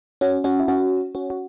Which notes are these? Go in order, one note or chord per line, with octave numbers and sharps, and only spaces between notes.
C#4 F#4
C#4 F#4
E4
C#4 F#4
C#4 F#4
F#4